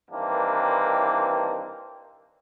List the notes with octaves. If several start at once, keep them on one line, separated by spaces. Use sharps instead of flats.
G2 D#3 E3 A#3 C4 D4